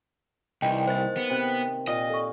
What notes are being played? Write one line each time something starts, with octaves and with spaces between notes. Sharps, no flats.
C2 D#3 E3 D#5 G5
A#3 C5 A6
B3
C3 G5 F#6
A#2 D#5 G5 D#6
A4 C#6